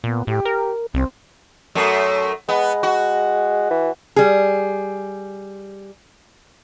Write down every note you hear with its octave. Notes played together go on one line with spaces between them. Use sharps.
A#2 B3
A2 G4
A#4
C2 C4
F#2 A3
G#3 B3
F#4
E3
G3 G#4